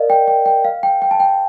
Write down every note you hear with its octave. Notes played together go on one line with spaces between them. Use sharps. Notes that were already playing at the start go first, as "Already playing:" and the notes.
Already playing: A#4 D5 D#5 F5
G5
G5
G5
F5
G5
G5
A5
G5